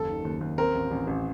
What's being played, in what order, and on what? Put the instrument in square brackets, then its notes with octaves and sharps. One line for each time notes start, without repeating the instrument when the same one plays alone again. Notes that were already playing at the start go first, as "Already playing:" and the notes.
Already playing: [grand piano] F#1 D#2 [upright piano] A4
[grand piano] D#3
D#2
D#2
[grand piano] C4 [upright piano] A#4
[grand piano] A1
A1
A1